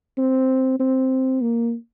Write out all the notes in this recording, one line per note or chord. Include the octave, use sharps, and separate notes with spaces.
C4
C4
A#3